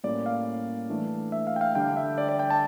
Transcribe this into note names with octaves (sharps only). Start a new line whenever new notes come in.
A2 G3 A#3 C#4 D5
F5
E3 A3 D4
E5
F5
G5
F5
D3 G3 D4 G5
E5
D5
D5
G5
A5